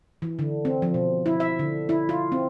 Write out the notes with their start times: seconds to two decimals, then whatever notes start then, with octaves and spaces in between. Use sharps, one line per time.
0.22 E3
0.39 D3
0.65 C4
0.82 F3
0.94 B2
1.26 E4
1.40 E5
1.59 D3
1.89 E4
2.09 F4
2.32 C4